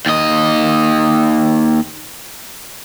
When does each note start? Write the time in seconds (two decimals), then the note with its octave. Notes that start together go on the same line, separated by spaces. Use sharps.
0.06 D#2 D#5